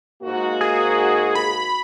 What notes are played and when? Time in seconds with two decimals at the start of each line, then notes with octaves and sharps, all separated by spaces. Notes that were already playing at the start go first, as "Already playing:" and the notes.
0.22 G#2 A#3 F#4
0.61 G#4
1.35 B5